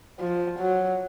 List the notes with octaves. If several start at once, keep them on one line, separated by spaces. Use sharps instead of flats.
F3
F#3